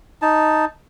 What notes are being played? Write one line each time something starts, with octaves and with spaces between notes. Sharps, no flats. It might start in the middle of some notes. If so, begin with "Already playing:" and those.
D#4 A5